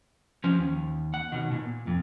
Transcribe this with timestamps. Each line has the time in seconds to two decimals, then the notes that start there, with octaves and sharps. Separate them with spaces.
0.44 F3 C#4
0.57 D#2
1.14 F#5
1.32 B2 D#3
1.52 A#2
1.87 F2